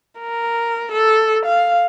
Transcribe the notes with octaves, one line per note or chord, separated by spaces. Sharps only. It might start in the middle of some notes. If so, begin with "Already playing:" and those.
A#4
A4
F5